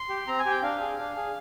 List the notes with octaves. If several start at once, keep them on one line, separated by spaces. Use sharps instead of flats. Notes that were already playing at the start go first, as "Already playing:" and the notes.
Already playing: C6
G4
C4 A#5
G#5
G4
G5
D4 F5
G#4
D4
G#4